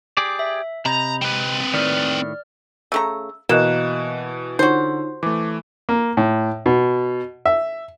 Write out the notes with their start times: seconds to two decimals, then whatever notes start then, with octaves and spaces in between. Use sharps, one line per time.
0.17 G4 G#4 D5
0.39 E5
0.85 C3 D#5 A#5 B5 G6
1.22 C4 B4
1.74 A2 D#3 D5 F6
2.92 C#3 A3 A#5 E6
3.49 B2 E3 A#3 F#4 D#5 F#6 E7
4.59 D3 D#4 F4 F#4 C5 C#5
5.23 E3 A3 D6
5.89 A#3
6.17 A2
6.66 B2
7.45 E5